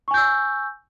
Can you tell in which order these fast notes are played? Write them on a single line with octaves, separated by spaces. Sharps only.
C#6 G#5 G6 E6